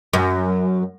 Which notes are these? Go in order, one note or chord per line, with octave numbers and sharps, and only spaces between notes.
F#2